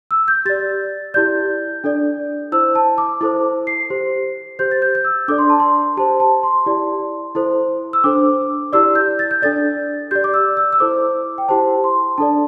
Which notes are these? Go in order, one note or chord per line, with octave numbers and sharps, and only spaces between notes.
E6
G6
G4 D5 A6
E4 G4 D5 G6
D4 A4 D5
E4 C5 E6
A5
D6
E4 A4 C5 D6
C7
G4 C5
G4 C5 G6
A6
G6
G6
E6
D4 A4 D5 D6
C6
A5
C6
G4 C5 A5
A5
C6
E4 G4 D5
E4 A4 C5
E6
D4 A4 C5 D6
E4 G4 D5 E6
G6
A6
G6
D4 A4 D5 A6
G4 D5 G6
D6
E6
E6
E6
E4 A4 C5 D6
G5
E4 G4 C5 A5
C6
D4 A4 D5 A5